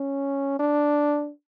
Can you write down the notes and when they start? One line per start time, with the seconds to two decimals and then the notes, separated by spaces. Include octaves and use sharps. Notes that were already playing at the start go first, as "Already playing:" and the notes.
Already playing: C#4
0.59 D4